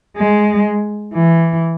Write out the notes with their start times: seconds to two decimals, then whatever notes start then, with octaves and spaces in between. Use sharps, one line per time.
0.16 G#3
1.14 E3